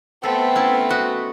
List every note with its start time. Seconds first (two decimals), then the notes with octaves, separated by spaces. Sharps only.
0.23 A3 B3 C4 A4
0.55 C#4 E4 A5
0.89 F#4 D#5